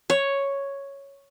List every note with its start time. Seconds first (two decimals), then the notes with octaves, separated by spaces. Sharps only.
0.10 C#5